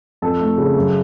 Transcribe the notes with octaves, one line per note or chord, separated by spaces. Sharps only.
F2 A4
A3
C#3
F#2